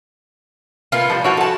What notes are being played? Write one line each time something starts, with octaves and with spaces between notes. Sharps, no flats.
A#3 B3 F4
F3 G3
F3 E4 F#4 C#5
A4 A5